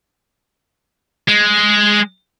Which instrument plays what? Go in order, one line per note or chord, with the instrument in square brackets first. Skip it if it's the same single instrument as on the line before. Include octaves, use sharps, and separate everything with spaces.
[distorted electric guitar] G#3